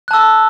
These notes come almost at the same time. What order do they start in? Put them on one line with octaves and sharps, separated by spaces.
F#6 A5 E6